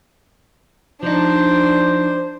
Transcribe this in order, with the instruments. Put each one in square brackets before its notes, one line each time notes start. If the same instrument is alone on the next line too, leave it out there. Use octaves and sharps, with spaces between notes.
[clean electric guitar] F3 D#4 [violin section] D4 [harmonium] C5